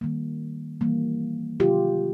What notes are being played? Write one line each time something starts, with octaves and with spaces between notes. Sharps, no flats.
D#3 G3 A#3
E3 G3 A#3
C3 D#3 F#3 F4 G4